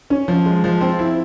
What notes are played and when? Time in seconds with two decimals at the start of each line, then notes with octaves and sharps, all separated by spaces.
0.10 C#4
0.28 F3
0.46 G#3
0.64 F3
0.81 C4
0.99 E4